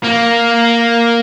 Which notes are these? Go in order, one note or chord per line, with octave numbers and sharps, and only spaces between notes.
A#3